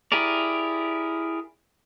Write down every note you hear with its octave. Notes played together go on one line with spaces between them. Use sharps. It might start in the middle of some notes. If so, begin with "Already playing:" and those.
E4 G4 G#4 A#4 D5